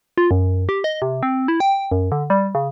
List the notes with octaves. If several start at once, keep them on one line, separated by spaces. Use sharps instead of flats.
F4
F#2
G4
D#5
C3
C4
E4
G5
F#2
D3
G3
C#3